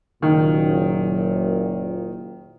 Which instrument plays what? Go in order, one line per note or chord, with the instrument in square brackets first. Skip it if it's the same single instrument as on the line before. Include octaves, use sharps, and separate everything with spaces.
[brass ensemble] F#1 A#2 [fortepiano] D#3